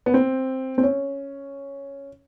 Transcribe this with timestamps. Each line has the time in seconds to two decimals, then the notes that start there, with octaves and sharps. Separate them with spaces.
0.06 B3
0.14 C4
0.78 C4
0.83 C#4